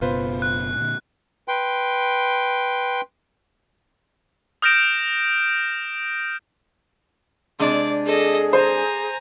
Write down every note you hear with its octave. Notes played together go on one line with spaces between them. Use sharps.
F#1 B2 B3 F4 B4 C5
F#6
A#2 D3
B4 G5 C6
D#6 F6 G6 A#6 D7 E7
C3 G#3 D4 D5
G#4 A4 D#5
C5 G#5 A#5